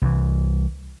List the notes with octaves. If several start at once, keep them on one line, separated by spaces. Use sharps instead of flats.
C2 E3